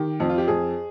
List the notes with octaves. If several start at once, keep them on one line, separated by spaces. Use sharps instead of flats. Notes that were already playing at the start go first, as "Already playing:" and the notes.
Already playing: D#3 G4
F2
F4
G4
F2 G#4